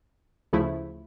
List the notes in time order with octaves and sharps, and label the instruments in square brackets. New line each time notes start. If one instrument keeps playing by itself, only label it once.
[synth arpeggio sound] D2 C#3 F3 A3 E4